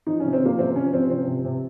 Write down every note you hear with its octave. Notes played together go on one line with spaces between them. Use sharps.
F3 D#4
C#4
C3
C4
F3 A#3
C3 C4
F3 C#4
C3 C4
F3 C4
C3
C3